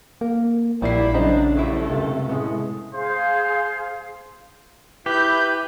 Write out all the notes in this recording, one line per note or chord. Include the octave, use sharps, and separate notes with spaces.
A#3 A#4
A#1 A#2 G3 E4 D5 B5 C7
C#3 F#3 D4 C5 D#5 A#5
G3 A3 E4 F4 A4
C#2 F#2 C3
A2 G#3 B3
G#4 C5 F5
E4 G4 B4 G6